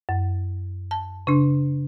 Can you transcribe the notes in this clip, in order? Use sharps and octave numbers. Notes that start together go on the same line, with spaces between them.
F#2
A5
C#3 D4